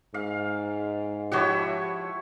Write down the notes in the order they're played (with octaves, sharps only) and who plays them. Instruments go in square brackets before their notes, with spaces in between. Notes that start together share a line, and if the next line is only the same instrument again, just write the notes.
[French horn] G#2 [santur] F5
[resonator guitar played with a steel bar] F3 F#4 G4 [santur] E4 C#5 F#5